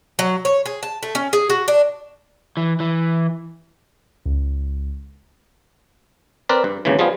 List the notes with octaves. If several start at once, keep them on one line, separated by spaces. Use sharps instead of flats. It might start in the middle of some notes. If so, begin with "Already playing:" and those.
F#3
C#5
G#4
A5
A3
C#4
G#4
F#4
D4
E3
E3
C#2
C4 A#4 B4 D5
G2
G#1 D#2 C#3 E3
F3 G3 B3 F4 G#4